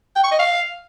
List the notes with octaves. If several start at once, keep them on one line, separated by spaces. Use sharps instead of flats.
G5
C#6
D#5
F5